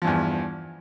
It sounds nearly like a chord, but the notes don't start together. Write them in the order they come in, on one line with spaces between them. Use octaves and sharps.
F3 G2 E2